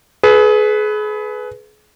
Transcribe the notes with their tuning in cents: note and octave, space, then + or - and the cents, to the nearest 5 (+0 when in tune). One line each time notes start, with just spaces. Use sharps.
G#4 +35 B4 +5